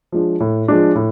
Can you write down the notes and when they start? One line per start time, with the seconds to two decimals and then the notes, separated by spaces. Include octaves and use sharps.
0.12 F3 G#3 D4
0.40 A2
0.68 F3 G#3 D4
0.95 A2